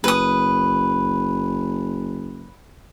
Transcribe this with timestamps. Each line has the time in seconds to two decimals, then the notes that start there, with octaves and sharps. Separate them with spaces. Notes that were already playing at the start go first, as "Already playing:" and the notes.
0.04 F#1 B4 D#6